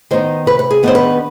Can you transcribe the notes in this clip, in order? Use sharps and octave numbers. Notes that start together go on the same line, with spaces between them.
D#3 B3 D#4 C5
C3 B4
B4
G#4
D#3 B3 D4 C5
B4